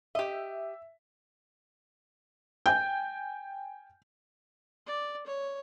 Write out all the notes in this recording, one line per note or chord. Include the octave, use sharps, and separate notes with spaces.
G4 D#5 E5
G5 G#5 G6
D5
C#5